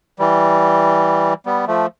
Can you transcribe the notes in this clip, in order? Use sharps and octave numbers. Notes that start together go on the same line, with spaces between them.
E3 G3
G3 B3
F3 A3